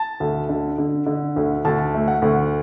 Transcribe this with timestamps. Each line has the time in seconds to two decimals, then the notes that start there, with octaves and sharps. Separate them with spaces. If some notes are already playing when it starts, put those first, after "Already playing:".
Already playing: A5
0.20 D2
0.49 D3
0.78 D3
1.06 D3
1.36 D2
1.65 D2 A5
1.94 A3
2.08 F#5
2.22 D2